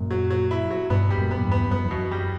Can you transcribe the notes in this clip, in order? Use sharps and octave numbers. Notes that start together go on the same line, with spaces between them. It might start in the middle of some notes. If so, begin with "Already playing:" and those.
Already playing: F#2 A#2
F#3
F#3
E4
F#3
G2 B2 B3
G3
F#2 A#2
B3
A#2
E2 G2
B3
F#2 B3
E2
B2
F#2
G3